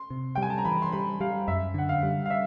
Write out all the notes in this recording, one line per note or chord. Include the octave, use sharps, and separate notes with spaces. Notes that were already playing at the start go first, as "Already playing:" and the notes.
Already playing: C6
C3
G3 G5
G#5
A5
A#5
E3 B5
C6
G3 B5
G3 F5
F#2 E5
D3 F#5
F5
G3
F5
E5